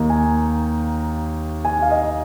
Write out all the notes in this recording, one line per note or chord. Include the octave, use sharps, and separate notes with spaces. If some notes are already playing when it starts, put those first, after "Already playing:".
Already playing: D#2 D#3 A#3 D#4
G#5
G#5
F5
D#5